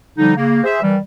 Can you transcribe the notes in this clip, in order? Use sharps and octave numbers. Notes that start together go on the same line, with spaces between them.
D3 F3 G3 D#4
C#3 A#3
G#4 C5 E5
D#3 E3 G3